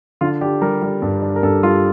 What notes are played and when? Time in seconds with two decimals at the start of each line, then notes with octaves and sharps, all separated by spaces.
0.21 D3 F4
0.41 D4 G4
0.61 G3 A#4
0.82 G3
1.02 G2
1.22 D4
1.36 A#4
1.43 G2 A4
1.63 G3 F4